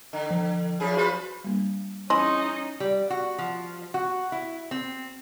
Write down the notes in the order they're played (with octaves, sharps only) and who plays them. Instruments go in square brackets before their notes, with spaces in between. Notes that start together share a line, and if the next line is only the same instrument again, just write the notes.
[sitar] D3
[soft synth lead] F3
[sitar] F#2 F3 G#4
[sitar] F4 B4 C5 [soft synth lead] F#4
[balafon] G3 A#3 D4
[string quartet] C#4 D#4 [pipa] E4 G#4 D#5 [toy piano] C6
[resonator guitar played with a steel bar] G3
F#4
F3
F#4
E4
C4